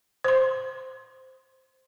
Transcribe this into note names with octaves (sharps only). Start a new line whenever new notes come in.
C5 C6